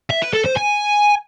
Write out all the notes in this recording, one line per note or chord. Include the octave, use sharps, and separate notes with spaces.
E5
B4
A4
C5
G#5